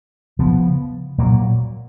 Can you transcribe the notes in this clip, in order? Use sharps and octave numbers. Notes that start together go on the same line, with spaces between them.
C#3 F3 B3
A#2 F#3 A#3